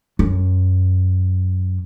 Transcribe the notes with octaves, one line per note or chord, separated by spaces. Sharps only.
F#2